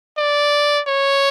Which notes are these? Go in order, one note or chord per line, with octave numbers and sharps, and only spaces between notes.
D5
C#5